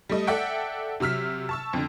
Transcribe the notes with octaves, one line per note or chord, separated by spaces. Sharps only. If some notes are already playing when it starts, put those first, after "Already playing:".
G3 A3 D#5
A4 D5 E5 F#5 G5
C3 F#3 E6 F6 B6
A5 C#6 E6
F2 D3